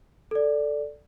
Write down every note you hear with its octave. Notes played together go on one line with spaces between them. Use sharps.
A4 D5